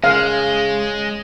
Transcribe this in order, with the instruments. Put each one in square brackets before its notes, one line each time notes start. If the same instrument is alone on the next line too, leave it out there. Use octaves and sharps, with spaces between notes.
[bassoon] C#3 [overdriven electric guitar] G#3 [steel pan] F5